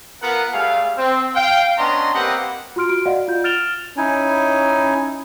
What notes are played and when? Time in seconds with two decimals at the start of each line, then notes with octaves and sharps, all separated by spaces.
0.22 B3 F4 A#4 F#5
0.53 G3 A3 G#4 F5
0.97 C4
1.35 F5 G5
1.78 B3 C#4 D4 D#5 A#5 C6
2.14 A#3 C4 G4 B4 D#5 F#5
2.76 F4 F#4 C6 F6 D7
2.89 F#4 D7
3.05 F#4 D5 D#5 F5 F#5
3.28 F4 G6
3.44 F6 A6 D7 E7 F7 G7
3.97 C#4 D#4 E4 G#5